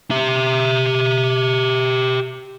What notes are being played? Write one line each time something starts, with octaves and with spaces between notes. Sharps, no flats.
G4 E5